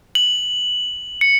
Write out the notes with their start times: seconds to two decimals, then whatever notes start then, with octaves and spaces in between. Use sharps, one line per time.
0.15 F#7
1.21 C#7